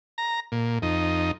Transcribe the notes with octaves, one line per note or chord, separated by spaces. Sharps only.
A#5
A#2
F2 D#4